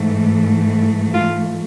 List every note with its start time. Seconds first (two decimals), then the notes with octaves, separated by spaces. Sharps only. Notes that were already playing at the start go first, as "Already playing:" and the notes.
Already playing: G#2 E3 A3
1.15 F4